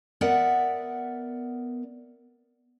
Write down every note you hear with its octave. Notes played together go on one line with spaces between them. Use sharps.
B3 A#4 D5 E5 F#5